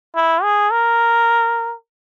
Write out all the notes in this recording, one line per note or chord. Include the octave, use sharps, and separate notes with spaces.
E4
G#4
A#4